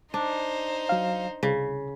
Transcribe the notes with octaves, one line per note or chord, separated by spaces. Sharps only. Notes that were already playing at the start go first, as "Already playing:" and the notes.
D4 D#4 C5
F#3 F5
C2 C#3